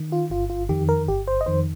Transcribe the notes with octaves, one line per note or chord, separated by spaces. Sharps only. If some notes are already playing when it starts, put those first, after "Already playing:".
Already playing: D#3
F4
G1 F4
F4
F2 D#3 G4
A#4
G1 G4
C5
D#5
F2 D#3 C5